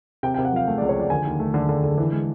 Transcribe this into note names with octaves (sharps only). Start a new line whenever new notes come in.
C3 G5
C3 G5
F#5
F3 F5
A3
C#2 D5
C#5
F3 D5
D3 G#5
D#2
A3
D3
D3
D3
E3
G#3